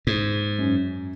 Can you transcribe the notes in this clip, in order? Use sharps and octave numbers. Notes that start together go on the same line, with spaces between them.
G#2
F#2